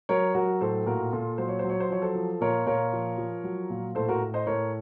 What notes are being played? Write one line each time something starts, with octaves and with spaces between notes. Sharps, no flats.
F#3 A#4 C#5
F#3 F#4 A#4
A2 A4 C5
A#2 F#4 A#4
A#2 F4 A4
F#3 C5
C#5
F#3 C5
C#5
C5
F3 C#5
A4 C5
F3
A#2 A#4 C#5
A#2 A#4 C#5
F3
F3
F#3
A#2
A2 A4 C5
F#4 A#4
A2
C5 D#5
A2 A#4 C#5